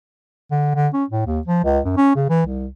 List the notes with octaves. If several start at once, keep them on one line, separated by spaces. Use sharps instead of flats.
D3
D3
C#4
A2
D#2
F3
C#2
F#2
C#4
C#3
E3
C2